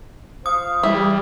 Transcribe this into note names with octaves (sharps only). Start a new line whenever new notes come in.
F4 C5 F5 D#6
E3 G3 G#3 E4